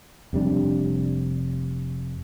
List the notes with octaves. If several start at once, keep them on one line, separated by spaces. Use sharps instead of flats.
F1 C3 G3 D4